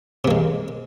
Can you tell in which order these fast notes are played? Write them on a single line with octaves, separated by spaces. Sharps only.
C3 A#3 G#3